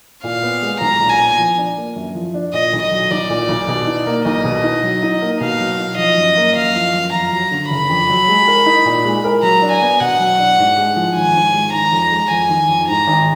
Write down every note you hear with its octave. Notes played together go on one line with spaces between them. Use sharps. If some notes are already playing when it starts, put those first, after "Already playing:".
A#2 F5
B3
G#3
B1 A#5
A#2
G#5
B3
F3
D4
A#3
F#2
F3
D4
A#2 D#5
B1
D#5
F#3
B1 D5
A#2
B1
B2
D#4
A#3
B1 D#5
B2
D#4
F#3
D#4
A#3
B2 F5
F#3
D#4
F3 D#5
F#2
A#3
F#2 F5
F3
F#2
F2 A#5
F#3
D3
F#1 B5
F2
F#3
G#3
A#4
D#4
A#2
G#3
A#4
F#3 A#5
D4
G#5
B3
B2 F#5
F#3
D4
G#2
G#3
F3
G#1 G#5
G#2
G#3
D#3 A#5
F2
G#3
F2 G#5
D#3
F2
G#2 A#5
G#1